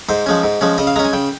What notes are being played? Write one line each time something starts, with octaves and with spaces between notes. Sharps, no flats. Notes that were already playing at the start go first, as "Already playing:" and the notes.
G#2 C5
F3 G#3 C#4
G#2
F3 G#3 C#4
C#3 D#5
F5
G#3 C#4 A#5
G#5
C#3 G5